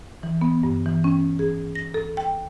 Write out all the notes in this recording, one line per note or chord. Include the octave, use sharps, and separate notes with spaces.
E3
B3
G2
E3
C#4
G#4
A#6
A4
G5